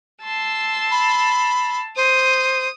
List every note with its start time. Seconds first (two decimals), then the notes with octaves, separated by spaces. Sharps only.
0.23 A5 C6 E6
0.91 B5
1.96 C5 D#6